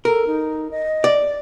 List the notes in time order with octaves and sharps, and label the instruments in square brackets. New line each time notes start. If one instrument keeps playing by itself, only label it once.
[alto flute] A4 [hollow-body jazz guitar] A#4
[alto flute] D#4
D#5
[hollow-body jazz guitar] D5